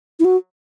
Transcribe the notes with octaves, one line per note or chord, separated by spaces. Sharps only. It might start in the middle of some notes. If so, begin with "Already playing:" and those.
E4
F#4